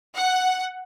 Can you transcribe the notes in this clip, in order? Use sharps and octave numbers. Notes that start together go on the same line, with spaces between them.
F#5